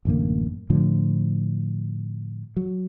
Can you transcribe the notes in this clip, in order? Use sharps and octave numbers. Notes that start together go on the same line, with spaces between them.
A1 F#2 D3 A#3
A2 D3 F3
F#3